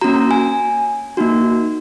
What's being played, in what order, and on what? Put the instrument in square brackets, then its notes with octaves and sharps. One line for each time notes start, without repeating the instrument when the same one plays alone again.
[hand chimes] A#3 C#4 F#4 A#5
G#5
A#3 D#4 F#4